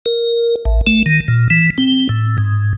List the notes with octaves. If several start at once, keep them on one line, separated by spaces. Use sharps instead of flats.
A#4
A1
A3
D#3
A#2
E3
C4
A2
G#2